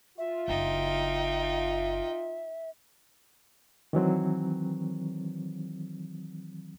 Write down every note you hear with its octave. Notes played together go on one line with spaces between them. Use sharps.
F4 E5
F#1 D4 D#4 G5
D#3 E3 F#3 C4